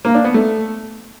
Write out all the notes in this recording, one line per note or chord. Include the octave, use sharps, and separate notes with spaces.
A#3
D4
B3
A3